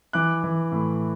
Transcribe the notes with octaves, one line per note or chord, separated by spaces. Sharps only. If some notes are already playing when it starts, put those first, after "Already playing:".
E3 D6 F#6
E3
A2